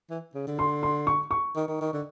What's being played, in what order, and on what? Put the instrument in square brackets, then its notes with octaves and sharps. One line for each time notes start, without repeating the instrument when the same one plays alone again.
[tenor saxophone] E3
C#3
D3
[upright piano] C6
C6
C#6
C#6
[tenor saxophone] D#3
D#3
D#3
D3